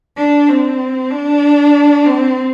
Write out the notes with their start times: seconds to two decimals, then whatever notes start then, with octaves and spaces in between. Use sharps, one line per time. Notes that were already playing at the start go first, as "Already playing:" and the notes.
0.17 D4
0.48 C4
1.11 D4
2.06 C4